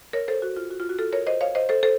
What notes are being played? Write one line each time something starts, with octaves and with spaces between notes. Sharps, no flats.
A#4 C#5
A4 C5
F#4
F4
F#4
F4
F#4
F4 A4
A#4 C#5
C5 D#5
C#5 F5
C5 D#5
A4 C5
A4 C5